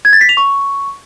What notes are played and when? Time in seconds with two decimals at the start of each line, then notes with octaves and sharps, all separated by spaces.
0.05 G#6
0.13 A6
0.21 B6
0.29 F7
0.37 C#6